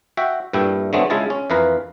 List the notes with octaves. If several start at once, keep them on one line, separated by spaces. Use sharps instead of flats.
F#4 E5 G5
G2 A#2 A3 E4 G5
D3 F#3 G#3 A3 B3 C4
C#3 G#3 E4 F4 G#4 A5
C#4
F2 E3 A#4 B4 F5 A#5